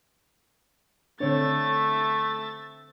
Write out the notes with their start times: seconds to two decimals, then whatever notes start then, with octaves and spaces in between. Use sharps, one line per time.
1.20 D3 A3 C4 D4 C5 C#5 E5 A6